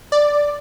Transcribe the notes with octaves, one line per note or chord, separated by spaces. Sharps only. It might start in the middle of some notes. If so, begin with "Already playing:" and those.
D5